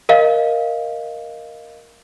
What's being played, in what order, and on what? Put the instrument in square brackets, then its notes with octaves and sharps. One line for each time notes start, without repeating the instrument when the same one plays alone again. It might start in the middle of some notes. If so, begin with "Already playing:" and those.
[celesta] A#4 D#5 F5